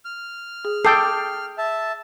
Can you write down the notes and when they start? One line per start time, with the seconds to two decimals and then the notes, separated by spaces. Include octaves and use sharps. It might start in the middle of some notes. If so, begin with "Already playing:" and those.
0.05 F6
0.65 G#4
0.85 A4 G5 D6 D#6 C7
1.58 E5 A5